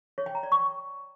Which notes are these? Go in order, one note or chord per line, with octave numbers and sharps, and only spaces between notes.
C#5
G5
A#5
D5
C#6